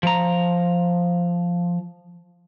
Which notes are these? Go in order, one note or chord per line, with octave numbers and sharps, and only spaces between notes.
F3 A#5